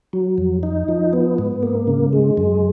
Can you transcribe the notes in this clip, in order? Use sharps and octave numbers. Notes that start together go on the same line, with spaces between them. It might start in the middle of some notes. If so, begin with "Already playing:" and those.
F#3
F2
D#4
F3
B3
G#2
A#3
C#3
G#3
F#2